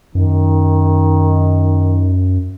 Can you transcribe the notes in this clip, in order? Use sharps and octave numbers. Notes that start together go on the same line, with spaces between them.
F#2 D#3